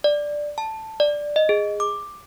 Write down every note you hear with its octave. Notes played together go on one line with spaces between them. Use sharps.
D5
A5
D5
D#5
G#4
D6